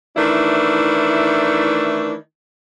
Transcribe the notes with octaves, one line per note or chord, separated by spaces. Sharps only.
D#3 E3 A3 D4 E4